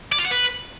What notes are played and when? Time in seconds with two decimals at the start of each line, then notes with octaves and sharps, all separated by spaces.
0.12 D5
0.19 F4
0.25 F#5
0.31 B4